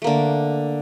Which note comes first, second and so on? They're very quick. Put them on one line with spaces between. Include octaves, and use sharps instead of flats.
A3 A#3 D3